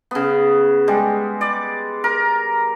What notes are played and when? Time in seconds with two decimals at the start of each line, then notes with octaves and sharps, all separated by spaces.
0.11 C#3 B3
0.88 G3 G#3
1.41 D5
2.04 A#4